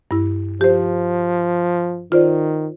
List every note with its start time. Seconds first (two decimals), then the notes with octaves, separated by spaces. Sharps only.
0.11 G2 E4
0.61 F3 G4 C5
2.12 D#3 F4 C5 D5